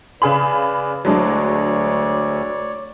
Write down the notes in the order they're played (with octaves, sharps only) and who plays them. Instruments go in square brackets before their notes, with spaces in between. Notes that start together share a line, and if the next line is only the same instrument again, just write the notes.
[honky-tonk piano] C#3 G#4 B5 [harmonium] B4 D5
[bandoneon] D2 [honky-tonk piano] F#3 G#3 D4 [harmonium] C#5 D5